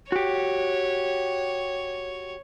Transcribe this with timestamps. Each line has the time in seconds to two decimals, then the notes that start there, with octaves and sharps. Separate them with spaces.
0.12 F#4 G4 C#5